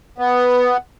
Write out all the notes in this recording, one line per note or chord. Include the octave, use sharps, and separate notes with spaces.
B3